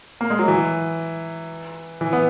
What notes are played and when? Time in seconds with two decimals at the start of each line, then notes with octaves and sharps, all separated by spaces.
0.21 A#3
0.30 G#3
0.39 F#3
0.48 E3
2.01 E3
2.13 B3